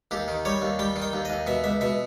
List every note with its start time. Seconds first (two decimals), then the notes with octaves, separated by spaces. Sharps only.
0.11 D#2 G4
0.28 D#3
0.45 G3 C#5
0.62 D#2
0.79 G3 G5
0.96 D#3
1.02 G5
1.13 D#2
1.25 D#2 D#5
1.47 B2 E5
1.64 C#2 E5
1.81 B2 E5